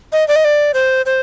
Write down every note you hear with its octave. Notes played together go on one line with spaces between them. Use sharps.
D#5
D5
D#5
D5
C5
C5